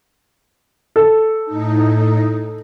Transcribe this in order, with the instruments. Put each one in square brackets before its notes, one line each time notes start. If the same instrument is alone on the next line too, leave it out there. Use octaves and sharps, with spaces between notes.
[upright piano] A4
[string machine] A2 D#4